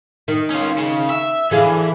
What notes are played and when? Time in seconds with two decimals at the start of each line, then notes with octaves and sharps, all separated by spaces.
0.28 D#3
0.50 C#4 F4
0.78 C#3
1.10 E5
1.51 D3 E3 G#4 F5